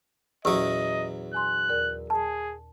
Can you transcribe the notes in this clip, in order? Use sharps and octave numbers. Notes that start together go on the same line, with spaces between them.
E2 A#2 F#3 C#4 G4 D#5 D#6 E6
G#5 C6 F#6
D#2 A#4 D5
G#4 A5